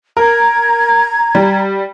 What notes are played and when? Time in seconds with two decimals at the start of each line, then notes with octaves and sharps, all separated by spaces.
0.17 A#4 A#5 G#6
1.35 G3